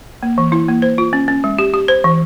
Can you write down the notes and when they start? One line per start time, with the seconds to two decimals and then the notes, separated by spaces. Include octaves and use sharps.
0.23 A#3
0.38 E3
0.52 E4
0.68 A#3
0.82 C5
0.98 F4
1.13 C#4
1.28 C#4
1.44 G#3
1.59 G4
1.74 G4
1.88 C5
2.04 E3